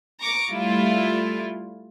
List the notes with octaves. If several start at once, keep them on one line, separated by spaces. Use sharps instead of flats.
A#5 C#6 D6
G3 A3 E4 F4